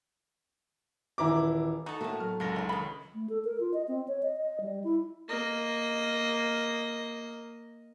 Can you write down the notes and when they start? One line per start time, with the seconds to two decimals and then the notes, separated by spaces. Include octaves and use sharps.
1.18 D#1 E3 E4 A#5 D6
1.86 D#4 F#4 A4
2.01 A2 A3 A#3 F#4 E5
2.20 F#3 F6
2.40 C#2 F#2 D3 A#4 A#6
2.56 D#3 E3
2.69 B2 D#3 B5
3.15 A3
3.30 A4
3.45 A#4
3.60 F4
3.74 D#5
3.88 C4
4.08 C#5
4.23 D#5
4.37 D#5
4.61 G3
4.84 E4
5.28 A#3 D#5